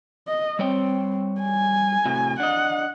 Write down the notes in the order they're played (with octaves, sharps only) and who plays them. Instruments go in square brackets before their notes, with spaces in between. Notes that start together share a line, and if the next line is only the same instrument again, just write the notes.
[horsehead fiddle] D#5
[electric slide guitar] G3 C#5 G5 [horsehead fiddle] C4
[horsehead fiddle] G#5
[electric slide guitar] A2 C3 F#4
[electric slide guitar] D4 D#5 [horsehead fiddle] F#5